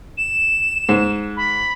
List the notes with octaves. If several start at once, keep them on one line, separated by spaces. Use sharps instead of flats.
E7
G#2
B5